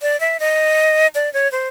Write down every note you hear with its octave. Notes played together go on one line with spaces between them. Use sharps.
D5
E5
D#5
D5
C#5
C5